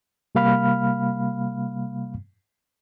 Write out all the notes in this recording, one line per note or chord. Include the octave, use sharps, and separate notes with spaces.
C3 G3 A#3 F5 B5 F6